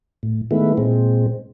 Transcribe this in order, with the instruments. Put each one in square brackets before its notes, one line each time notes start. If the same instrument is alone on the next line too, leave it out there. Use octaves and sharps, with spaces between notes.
[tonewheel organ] A2
D#3 G#3 A3 B3 E4
A#2 G#3 C4